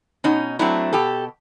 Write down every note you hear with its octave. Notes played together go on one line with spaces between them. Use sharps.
B2 C#4 D#4
F#3 A3 C4 D4 E4
B2 G4 A4